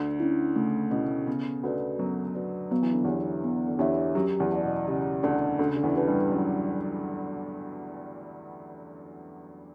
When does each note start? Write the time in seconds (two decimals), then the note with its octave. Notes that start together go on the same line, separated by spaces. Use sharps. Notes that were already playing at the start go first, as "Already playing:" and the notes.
Already playing: D2 D3
0.20 C#4 E4
0.56 C#3 A3
0.91 B2 C#4 E4
1.27 C#3 B3
1.63 D2 D3 F#4 B4 D5
1.99 F#2 F#3 B3
2.35 F#4 B4 D5
2.71 F#3 B3
2.82 E3
2.93 D3
3.04 E2 E3 D4 G4 C#5 E5
3.44 B3
3.68 D3
3.79 E2 E3 D4 G4 C#5 E5
4.15 F#2 F#3 G4
4.40 E2 E3
4.52 D5 F#5 A5
4.64 B2
4.87 C#3 G4
5.23 D2 D3 D5 F#5 A5
5.59 D2 D3 C#4
5.68 C#3
5.76 D3
5.83 E2 E3
5.95 G4 B4 F#5 A5
6.07 G2 G3
6.31 F#3 C#4